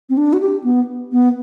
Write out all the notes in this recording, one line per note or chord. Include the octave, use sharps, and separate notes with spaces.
C4
D4
F#4
G4
B3
B3